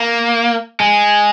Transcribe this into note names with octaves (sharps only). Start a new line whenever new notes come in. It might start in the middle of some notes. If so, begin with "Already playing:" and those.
Already playing: A#3
G#3